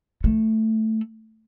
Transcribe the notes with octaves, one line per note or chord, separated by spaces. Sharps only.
A3